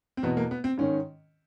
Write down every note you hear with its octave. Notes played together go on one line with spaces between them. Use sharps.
C4
E2 B2 B3
A#3
B3
C4
G#2 D#3 C#4